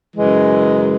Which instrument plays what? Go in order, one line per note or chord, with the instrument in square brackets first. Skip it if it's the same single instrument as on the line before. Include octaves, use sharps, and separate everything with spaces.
[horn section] F#2 C#3 E3 G#3